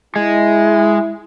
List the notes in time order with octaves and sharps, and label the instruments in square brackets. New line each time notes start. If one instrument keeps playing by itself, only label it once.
[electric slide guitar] G#3 [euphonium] E4